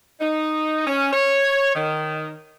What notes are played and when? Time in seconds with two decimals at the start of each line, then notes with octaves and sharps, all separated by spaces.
0.21 D#4
0.87 C#4
1.12 C#5
1.75 D#3